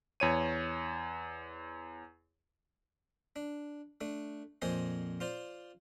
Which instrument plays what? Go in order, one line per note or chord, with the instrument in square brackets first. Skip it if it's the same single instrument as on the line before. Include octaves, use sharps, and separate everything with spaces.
[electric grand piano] E2 C#5 D#7
[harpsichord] D4
A3 D4
F2 A#2 C5 D#5 G#5
F4 C5 D5